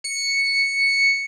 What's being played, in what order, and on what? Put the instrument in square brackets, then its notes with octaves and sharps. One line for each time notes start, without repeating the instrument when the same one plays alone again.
[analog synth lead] C#7